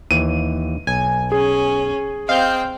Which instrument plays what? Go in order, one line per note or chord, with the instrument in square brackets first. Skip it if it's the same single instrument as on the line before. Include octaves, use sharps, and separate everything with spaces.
[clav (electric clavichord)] D#2 E3 [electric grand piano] D#7
[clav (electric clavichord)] B1 [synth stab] G#5
[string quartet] C#4 [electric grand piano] G#4
[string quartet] C4 G5 [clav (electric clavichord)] D#5 [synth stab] F5 G6